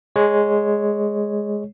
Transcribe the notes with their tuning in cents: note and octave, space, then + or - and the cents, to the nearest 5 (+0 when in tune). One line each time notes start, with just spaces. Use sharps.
G#3 +0 C#5 +0